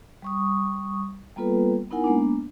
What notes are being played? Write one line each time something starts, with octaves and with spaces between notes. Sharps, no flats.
G3 C#6 D#6
G3 A#3 B3 F4 A4 B4
B3 D#4 E4 A#4 F#5 G#5
G#3 A#3 B3 D4